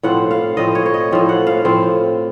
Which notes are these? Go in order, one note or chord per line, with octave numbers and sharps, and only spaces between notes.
A2 F3 C4 F#5
F5
A2 F3 C4 D#5
C#5
C#5
D#5
A2 F3 C4
F#5
F5
A2 F3 C4